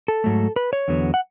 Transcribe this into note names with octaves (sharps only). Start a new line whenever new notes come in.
A4
G#2 F#3 A3
B4
C#5
E2 D3 F#3 B3
F#5